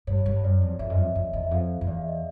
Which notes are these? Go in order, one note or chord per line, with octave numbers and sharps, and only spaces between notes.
G2 C#5
G2
F#2 D5
F2
F2 E5
F#2 D#5
F2
E5
F2
E2 D#5
E5
F2 F5
F2
E2 D5
F5
E5
D#5
D5